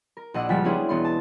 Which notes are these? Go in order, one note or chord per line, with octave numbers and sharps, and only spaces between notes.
A#4
A#1 D4 D#5 F#5 E6
C#2 F3 G3 G#3 F#4 B6
B3 C#4 D4 E4 G#4 C5
E1 B3 C6
A5